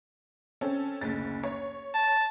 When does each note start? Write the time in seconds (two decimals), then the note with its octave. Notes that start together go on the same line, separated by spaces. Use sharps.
0.61 C4 C#4 A4
1.01 F#1 D2 A6
1.44 C#5
1.95 A5